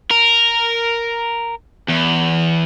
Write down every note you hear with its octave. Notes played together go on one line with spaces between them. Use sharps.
A#4
E2